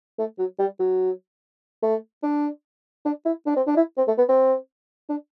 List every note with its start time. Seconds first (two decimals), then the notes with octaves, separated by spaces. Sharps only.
0.19 A3
0.39 F#3
0.59 G3
0.80 F#3
1.83 A3
2.23 D4
3.05 D4
3.26 E4
3.47 D4
3.57 C4
3.67 D4
3.77 E4
3.98 C4
4.08 A3
4.18 B3
4.29 C4
5.09 D4